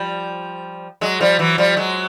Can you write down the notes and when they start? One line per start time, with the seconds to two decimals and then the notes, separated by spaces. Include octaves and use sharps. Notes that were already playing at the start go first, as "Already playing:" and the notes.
Already playing: F3 G3
1.01 F#3 G#3
1.20 F3 G3
1.39 E3 F#3
1.58 F3 G3
1.76 F#3 G#3